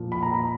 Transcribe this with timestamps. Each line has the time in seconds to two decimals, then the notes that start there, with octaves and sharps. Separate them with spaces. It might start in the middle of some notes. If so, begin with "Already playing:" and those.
Already playing: A#2 F3
0.12 B5
0.23 A#5
0.34 B5